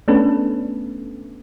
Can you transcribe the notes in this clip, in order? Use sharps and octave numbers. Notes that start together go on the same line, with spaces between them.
A3 B3 C#4 D4 A4 B4